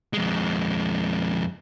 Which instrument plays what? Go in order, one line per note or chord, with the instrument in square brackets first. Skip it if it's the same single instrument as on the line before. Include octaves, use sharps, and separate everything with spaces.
[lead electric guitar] F2 G#3